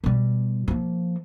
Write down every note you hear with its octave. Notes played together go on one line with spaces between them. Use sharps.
B2 G3
F3 A#3